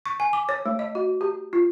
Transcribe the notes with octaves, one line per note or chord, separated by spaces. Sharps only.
C#6
G#5
D6
C#5
A3
D#5
F#4
G4
F4